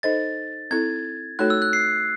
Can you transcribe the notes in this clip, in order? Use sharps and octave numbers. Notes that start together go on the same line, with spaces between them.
D#4 A4 C5 D#5 A6
C4 E4 A4 G#6
A3 D#4 F#4 A4 C#5 F#6
E6
F#6
C7